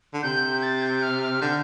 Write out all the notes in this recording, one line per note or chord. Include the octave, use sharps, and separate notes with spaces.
D3
C3 G6
G6
A6
G6
F6
F6
D3 G6